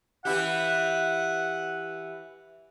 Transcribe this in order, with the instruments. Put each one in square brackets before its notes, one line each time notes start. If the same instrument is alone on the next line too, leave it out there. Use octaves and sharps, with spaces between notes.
[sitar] E3 E4 G4 [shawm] F#5